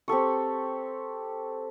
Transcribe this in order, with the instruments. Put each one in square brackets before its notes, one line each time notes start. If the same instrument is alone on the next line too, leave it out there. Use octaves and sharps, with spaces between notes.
[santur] C4 G4 A4 C#6